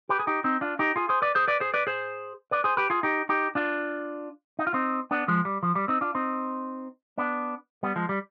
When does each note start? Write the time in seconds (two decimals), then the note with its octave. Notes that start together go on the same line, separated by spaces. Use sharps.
0.09 G4 B4
0.19 G#4
0.27 D#4 G4
0.44 C4 D#4
0.61 D4 F4
0.79 D#4 G4
0.96 F4 G#4
1.09 G#4 C5
1.22 B4 D5
1.35 G#4 C5
1.48 B4 D5
1.60 G#4 C5
1.74 B4 D5
1.87 G#4 C5
2.51 B4 D5
2.64 G#4 C5
2.77 G4 B4
2.90 F4 G#4
3.03 D#4 G4
3.29 D#4 G4
3.55 D4 F4
4.59 D#4
4.67 F4
4.74 C4 D#4
5.11 B3 D4
5.28 F3 G#3
5.45 G3
5.63 F3
5.75 G3
5.88 C4 D#4
6.01 D4 F4
6.15 C4 D#4
7.18 B3 D4
7.83 G3 B3
7.96 F3 G#3
8.09 G3